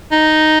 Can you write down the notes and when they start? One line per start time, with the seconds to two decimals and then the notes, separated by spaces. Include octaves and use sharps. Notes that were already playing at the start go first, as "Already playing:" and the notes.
0.12 D#4